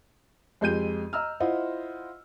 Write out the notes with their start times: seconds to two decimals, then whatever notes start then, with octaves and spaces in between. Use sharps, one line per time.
0.61 F2 G#3 G4 G6 D#7
1.13 D#5 A#5 E6 F6
1.40 E4 F4 C5 D#5 F#5